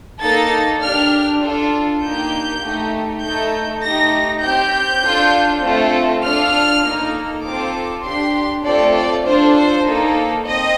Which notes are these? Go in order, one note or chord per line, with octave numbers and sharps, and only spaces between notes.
A#3 D#4 A4 A6
D4 G4 F6
D4 F4 A4
A#3 D#4 G4 G6
A3 D#4 G4
A3 D#4 A4 G6
A3 D#4 G4 A#6
C4 G4 G6
D4 F4 A4
A3 C4 F4 A4
D4 F4 A4 F6
A#3 D#4 A4
C4 F4 A4 D6
D4 G4 C6
A3 C4 F4 A4 D5
D5
D4 F4 A4 C5
C5
A#3 D#4 A4
C4 D#5